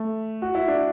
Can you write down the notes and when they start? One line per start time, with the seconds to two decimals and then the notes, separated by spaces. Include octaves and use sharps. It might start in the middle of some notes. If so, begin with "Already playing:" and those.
Already playing: A3
0.42 F#4
0.55 E4
0.68 D4